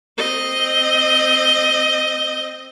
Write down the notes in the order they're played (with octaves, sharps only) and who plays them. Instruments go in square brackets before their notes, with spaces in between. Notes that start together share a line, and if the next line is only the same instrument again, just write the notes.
[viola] C4 D#5